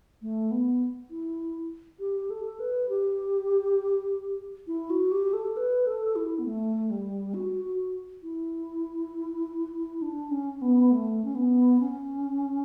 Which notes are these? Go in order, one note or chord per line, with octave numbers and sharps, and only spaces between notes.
A3
B3
E4
G4
A4
B4
G4
E4
F#4
G4
A4
B4
A4
E4
B3
A3
G3
F#4
F#4
E4
D4
C#4
B3
A3
C#4
B3
C#4